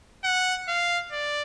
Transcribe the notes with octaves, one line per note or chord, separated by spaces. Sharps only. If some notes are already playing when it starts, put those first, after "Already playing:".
F#5
F5
D5